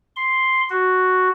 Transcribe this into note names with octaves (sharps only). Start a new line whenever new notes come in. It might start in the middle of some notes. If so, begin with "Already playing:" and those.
C6
F#4